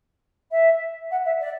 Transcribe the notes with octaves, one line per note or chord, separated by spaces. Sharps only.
E5
F#5
E5
D5